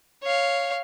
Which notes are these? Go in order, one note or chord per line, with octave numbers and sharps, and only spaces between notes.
C#5 F5